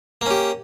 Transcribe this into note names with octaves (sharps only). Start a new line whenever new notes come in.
A#3 C#4 G4